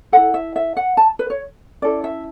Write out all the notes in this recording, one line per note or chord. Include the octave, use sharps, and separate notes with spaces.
E4 A4 F#5
E5
E5
F#5
A5
B4
C#5
C#4 E4 A4 D5
E5